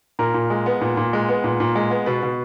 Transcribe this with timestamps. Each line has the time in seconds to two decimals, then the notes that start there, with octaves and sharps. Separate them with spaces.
0.19 A#2 A#4
0.34 A#2
0.50 G#3
0.66 B3
0.81 A#2
0.97 A#2
1.13 G#3
1.28 B3
1.44 A#2
1.60 A#2
1.75 G#3
1.90 B3
2.06 B2 B4
2.23 B2